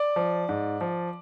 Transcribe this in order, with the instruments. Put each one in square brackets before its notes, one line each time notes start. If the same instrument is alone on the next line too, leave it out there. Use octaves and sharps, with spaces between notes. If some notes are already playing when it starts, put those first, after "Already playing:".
Already playing: [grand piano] D5
F3
G#2
F3